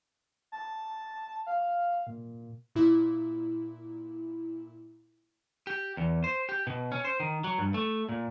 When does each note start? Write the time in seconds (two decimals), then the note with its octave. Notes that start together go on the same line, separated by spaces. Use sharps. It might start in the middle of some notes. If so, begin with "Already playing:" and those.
0.52 A5
1.46 F5
2.07 A#2
2.75 A#2 E4
5.67 G4
5.97 E2
6.24 C5
6.49 G4
6.67 B2
6.92 C#4
7.05 C5
7.20 D#3
7.44 F#3
7.58 G2
7.74 A3
8.09 A#2